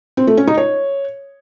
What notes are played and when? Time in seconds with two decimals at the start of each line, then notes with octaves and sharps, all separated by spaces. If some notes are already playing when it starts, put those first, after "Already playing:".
0.17 C4
0.27 A3
0.37 C#4
0.47 D#4
0.58 C#5